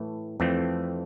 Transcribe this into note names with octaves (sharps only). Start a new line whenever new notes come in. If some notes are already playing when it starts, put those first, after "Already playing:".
Already playing: A2 E3 A3 A4
F2 E3 A3 C4